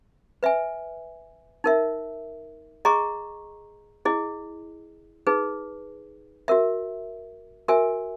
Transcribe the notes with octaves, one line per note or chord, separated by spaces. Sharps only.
B4 E5 G#5
D#4 A#4 E5
G#4 D#5 A#5 C#6
E4 G#4 D#5
D#4 G#4 B4
F#4 A#4 E5
F#4 A#4 E5 G#5